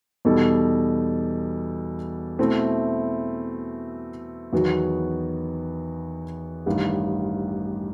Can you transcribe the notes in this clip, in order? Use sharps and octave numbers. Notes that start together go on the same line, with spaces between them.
E2 B2 G3 D#4 A4
B2 A3 C4 E4
E2 D#3 F#3 B3 F#4
A1 G2 D#3